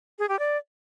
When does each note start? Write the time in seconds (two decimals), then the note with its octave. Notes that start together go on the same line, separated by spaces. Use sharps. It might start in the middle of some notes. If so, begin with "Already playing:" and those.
0.19 G#4
0.29 G4
0.39 D5